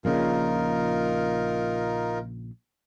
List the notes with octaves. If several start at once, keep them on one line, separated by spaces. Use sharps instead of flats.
A#1 A#2 C#3 D#4 F4 A#4